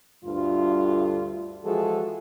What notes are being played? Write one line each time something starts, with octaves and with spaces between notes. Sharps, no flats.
D2 G2 F4
E3 F3 G#3 F#4 G#4 A4